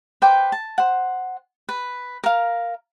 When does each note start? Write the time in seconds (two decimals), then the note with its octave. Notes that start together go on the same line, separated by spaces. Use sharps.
0.22 B4 C5 G5 D6
0.52 A5
0.78 C5 F#5
1.69 B4
2.24 A#4 F5